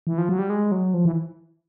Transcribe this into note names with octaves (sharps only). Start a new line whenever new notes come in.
E3
F3
F#3
G3
G#3
F#3
F3
E3